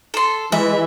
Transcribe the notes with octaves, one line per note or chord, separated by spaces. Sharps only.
A4 C6
E3 G#3 E5